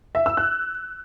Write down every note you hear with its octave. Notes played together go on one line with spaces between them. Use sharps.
E5
E6
F#6